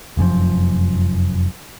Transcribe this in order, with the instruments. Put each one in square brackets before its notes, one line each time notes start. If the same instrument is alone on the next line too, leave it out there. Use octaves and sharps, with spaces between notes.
[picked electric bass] F1 F#2 C3 F3